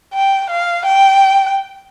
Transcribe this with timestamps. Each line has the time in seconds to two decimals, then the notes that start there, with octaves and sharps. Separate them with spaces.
0.14 G5
0.50 F5
0.85 G5